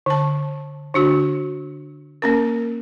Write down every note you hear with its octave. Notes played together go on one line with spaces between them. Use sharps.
D3 A5
D3 D4 F#4
A#3 C#4 A#4